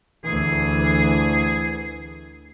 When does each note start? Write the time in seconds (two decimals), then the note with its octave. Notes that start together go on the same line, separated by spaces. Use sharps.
0.24 D2 E3 G#4